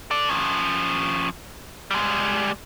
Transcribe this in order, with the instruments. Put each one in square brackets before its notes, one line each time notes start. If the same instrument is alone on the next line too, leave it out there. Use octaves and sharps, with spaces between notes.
[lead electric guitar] A4 D5
F3 C#4
G3 G#3